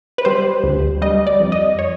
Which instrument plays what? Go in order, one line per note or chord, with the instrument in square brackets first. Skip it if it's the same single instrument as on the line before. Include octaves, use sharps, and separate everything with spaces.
[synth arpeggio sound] B4
G3 C5
D2
G3 D#5
D5
F2
D#5
C#5